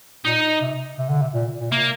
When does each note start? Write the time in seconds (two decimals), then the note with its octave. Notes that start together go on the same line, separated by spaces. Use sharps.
0.25 A#2 D#4
0.61 C3
0.98 C3
1.10 D3
1.22 C3
1.34 A#2
1.60 A#2
1.71 C3 A#3